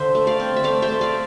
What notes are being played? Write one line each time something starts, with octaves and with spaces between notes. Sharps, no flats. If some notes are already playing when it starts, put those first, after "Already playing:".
Already playing: D3 C5 E5
A3
D5 F5
C4
E5
A3 D5 F5
C5 E5
A3
D5 F5